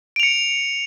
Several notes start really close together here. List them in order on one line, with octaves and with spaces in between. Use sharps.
D7 F7 C#7